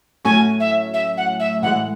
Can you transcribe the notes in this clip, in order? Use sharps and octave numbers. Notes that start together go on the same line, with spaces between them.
A2 F#3 A3 C#4 F#4 G#5
E5
E5
F#5
E5
A2 E3 G#3 F#5